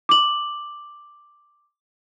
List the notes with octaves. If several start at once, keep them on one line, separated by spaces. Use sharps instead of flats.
D6 F#7